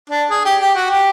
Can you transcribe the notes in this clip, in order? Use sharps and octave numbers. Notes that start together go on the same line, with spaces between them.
D4
G#4
G4
G4
F#4
G4